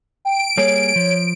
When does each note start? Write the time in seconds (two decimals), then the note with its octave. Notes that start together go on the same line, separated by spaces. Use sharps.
0.25 G5 D7
0.57 G3 A#3 G#4 C#5
0.96 F3